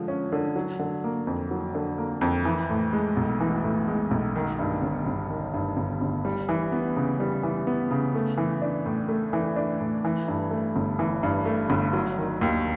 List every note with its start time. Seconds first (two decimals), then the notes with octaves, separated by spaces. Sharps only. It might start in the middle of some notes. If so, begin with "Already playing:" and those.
Already playing: D3 F3 G#3
0.08 C#4
0.32 D3
0.56 F#3
0.79 D3
1.04 A#3
1.27 F2
1.51 F#3
1.75 D3
1.98 A#3
2.21 F2
2.45 E3
2.70 A2
2.93 G#3
3.17 B1
3.40 E3
3.64 A2
3.88 G#3
4.11 B1
4.36 D#3
4.59 G2
4.82 G1
5.07 G1
5.30 D#3
5.54 G2
5.77 G1
6.01 G1
6.25 G3
6.49 E3
6.72 B3
6.96 C#3
7.20 G3
7.43 E3
7.67 B3
7.91 C#3
8.15 A3
8.37 E3
8.62 D4
8.86 A2
9.09 A3
9.33 E3
9.56 D4
9.81 A2
10.05 E3
10.28 G2
10.51 A3
10.76 G1
10.99 E3
11.23 G2
11.46 A3
11.70 G1
11.93 F#3
12.18 D#3
12.41 D#2